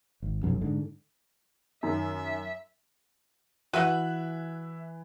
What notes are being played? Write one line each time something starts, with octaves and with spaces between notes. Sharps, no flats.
G#1
F1 B1 F#2
G#2 D3
F#2 D#3 E5
E3 F#4 B4 E5 F#5 F#6